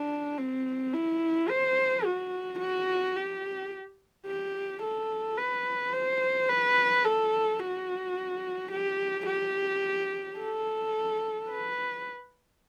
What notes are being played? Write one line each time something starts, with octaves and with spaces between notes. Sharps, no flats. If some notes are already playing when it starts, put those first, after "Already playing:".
Already playing: D4
C4
E4
C5
F#4
F#4
G4
G4
A4
B4
C5
B4
A4
F#4
G4
G4
A4
B4